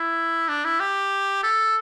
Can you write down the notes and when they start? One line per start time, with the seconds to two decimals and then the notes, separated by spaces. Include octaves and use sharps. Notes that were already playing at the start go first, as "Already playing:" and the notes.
Already playing: E4
0.49 D4
0.65 E4
0.80 G4
1.43 A4